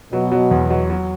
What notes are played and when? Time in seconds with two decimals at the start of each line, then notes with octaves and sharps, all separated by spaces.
0.13 B2 F#3
0.32 F#3
0.51 E2
0.70 F#3
0.90 F#3